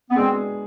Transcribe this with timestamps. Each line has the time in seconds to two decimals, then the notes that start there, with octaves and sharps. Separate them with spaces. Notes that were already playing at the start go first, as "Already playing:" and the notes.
0.10 B3
0.16 B2 G#3 C4 D4 G#4